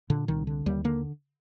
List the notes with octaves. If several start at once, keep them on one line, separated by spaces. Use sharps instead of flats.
A#2 D3
C2 D#3
D3
D#2 G3
D3 A#3